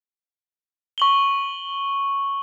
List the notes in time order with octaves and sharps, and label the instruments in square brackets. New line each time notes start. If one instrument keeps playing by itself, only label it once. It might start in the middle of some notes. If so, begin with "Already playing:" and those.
[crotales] C#6 F#7 G7